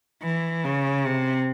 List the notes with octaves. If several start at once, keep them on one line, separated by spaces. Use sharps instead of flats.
E3
C#3
C3